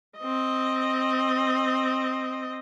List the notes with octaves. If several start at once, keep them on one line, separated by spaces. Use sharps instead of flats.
C4 D#5